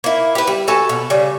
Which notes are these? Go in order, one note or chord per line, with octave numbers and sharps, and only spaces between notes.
A#3 E4
G4 B4
G3
F#4 A4 G#5 A5
B2
C#3 G3